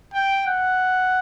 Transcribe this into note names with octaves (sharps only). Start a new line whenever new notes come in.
G5
F#5